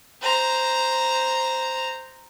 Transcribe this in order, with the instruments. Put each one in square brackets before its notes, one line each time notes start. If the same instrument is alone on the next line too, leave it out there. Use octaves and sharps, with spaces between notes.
[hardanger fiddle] C5 A#5